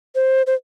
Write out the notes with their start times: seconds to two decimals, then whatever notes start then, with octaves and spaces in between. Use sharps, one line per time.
0.15 C5
0.47 C5